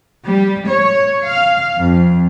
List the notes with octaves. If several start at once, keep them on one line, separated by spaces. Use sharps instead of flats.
G3
C#5
F5
F2